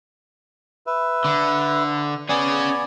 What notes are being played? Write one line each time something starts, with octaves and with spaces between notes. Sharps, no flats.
B4 E5
D3
B3 C#4 G#4 D5 G#5